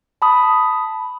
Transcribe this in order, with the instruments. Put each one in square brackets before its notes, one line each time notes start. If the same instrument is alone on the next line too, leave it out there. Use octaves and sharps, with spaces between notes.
[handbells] A5 B5 D#6